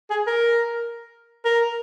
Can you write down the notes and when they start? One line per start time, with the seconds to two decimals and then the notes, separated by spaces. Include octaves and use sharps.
0.10 G#4
0.27 A#4
1.45 A#4